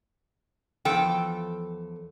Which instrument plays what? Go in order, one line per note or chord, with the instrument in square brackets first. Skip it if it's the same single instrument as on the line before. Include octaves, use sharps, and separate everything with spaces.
[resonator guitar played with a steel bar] E2 F3 A4 G5